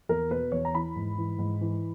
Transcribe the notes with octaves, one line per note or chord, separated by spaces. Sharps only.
E2 A#4
B2 B4
E2 C#5
A#5
E3 B5
G#2
E3
G#2
E3